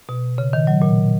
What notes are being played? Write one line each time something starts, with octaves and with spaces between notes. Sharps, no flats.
B2
C#3
D#3
F#3
A#2